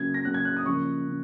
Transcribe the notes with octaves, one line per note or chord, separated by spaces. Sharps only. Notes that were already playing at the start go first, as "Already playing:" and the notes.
Already playing: C#3 F#3 A#3 G#6
A#6
C#3 F#3 A#3 F#6
G#6
F#6
D#6
C#3 F3 A#3 C#6
C#3